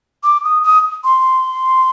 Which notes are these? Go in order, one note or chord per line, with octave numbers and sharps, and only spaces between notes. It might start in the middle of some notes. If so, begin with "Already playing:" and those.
D6
D#6
D#6
C6